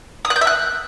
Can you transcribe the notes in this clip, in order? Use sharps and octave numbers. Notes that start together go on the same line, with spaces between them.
D#6
F#6
G6
E5
F#6